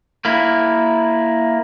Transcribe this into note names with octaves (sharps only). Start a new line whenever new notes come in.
A#3 E4